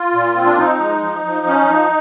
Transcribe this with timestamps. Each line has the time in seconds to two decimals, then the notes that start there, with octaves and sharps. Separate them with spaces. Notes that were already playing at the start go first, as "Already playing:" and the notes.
Already playing: F4
0.14 A#2
0.35 C4
0.46 D4
0.58 F3 D#4
0.80 G#3
1.02 F3
1.25 F3
1.47 C#4
1.69 F3